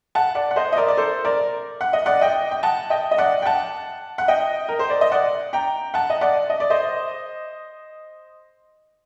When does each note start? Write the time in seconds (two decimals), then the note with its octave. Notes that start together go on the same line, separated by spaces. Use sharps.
0.15 F#5 A5
0.35 D5 F#5
0.51 F#5
0.56 C5 D#5
0.72 D#5
0.76 A#4 D5
0.88 D5
0.97 A4 C5
1.25 A#4 D5
1.81 F#5
1.93 D#5
2.06 D5 F#5
2.21 D#5 G5
2.51 G5
2.63 F#5 A5
2.90 D#5 G5
3.11 D#5
3.18 D5 F#5
3.42 G5
3.45 F#5 A5
4.18 F#5
4.28 D#5 G5
4.69 A#4
4.79 C5
4.90 D5
5.01 D#5
5.12 D5 F#5
5.53 G5 A#5
5.94 F#5 A5
6.10 D#5
6.21 D5 F#5
6.50 D#5
6.60 D5
6.70 C5 D#5